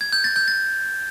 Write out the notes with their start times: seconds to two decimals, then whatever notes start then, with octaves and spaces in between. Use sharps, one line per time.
0.01 G#6
0.12 G6
0.24 A6
0.36 G6
0.48 A6